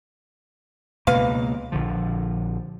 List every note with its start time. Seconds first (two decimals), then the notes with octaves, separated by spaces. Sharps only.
1.07 C#2 B2 A#3 B4 F5
1.72 A#1 D3 F3